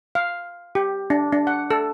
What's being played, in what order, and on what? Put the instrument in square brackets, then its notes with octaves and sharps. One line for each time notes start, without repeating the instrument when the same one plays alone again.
[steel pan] F5
G4
D4
D4
F#5
A4